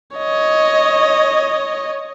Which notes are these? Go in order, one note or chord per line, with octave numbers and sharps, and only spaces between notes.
C#5 D#5